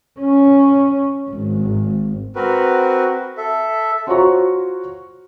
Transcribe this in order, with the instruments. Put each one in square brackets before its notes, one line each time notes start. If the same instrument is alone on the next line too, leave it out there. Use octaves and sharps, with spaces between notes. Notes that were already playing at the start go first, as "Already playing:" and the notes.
[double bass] C#4
G#1
[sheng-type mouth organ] C4 F#4 A#4 B4
A4 E5
[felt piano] F4 F#4 C5 C#5 A#5 C#6